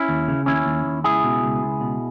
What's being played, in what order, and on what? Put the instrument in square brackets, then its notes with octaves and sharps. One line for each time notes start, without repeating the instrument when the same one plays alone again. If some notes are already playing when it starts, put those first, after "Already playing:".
Already playing: [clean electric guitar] C#4 E4
D#2
C#3
D#2 C#4 E4
D#2
D#2
C#2 E4 G#4
B2
C#2
C#2
B2